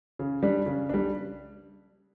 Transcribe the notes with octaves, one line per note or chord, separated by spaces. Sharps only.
C#3
G3 D4
C#3
G3 D4